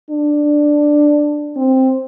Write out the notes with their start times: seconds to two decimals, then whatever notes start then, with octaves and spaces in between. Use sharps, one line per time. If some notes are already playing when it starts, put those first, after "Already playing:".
0.10 D4
1.56 C4